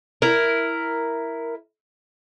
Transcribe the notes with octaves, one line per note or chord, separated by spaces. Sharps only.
E4 A#4